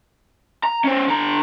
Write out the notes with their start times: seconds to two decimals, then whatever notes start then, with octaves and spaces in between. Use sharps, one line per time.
0.63 A#5
0.84 C#4 C5
1.08 D3 A#5